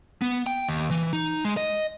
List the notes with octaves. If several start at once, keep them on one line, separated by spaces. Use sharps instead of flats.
B3
G5
D#2
E3
D#4
G#3
D#5